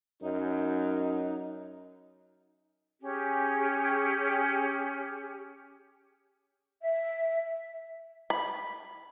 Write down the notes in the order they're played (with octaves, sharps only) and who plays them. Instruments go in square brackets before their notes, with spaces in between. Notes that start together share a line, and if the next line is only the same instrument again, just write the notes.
[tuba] F#2 [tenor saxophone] D#4
[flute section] C#4 G4 G#4
E5
[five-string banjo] B5